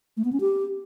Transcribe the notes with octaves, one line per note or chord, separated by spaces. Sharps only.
A3
B3
C#4
G4